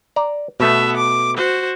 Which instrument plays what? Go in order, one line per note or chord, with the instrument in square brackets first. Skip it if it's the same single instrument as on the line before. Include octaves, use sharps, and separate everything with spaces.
[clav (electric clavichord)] D5 A#5
[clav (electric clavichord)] B2 A3 [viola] B3 E5
[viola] D6
F#4 C5